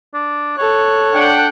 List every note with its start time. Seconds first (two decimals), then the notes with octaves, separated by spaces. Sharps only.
0.14 D4
0.57 A4 C#5 F#6
1.13 D4 F#5 G5